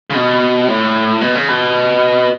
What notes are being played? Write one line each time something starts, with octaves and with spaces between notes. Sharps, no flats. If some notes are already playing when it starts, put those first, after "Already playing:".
C#3
B2
A2
B2
C#3
B2